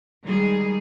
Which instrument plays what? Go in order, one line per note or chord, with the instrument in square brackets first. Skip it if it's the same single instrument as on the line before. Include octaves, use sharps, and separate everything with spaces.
[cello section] D#3 G3 G#3 G#4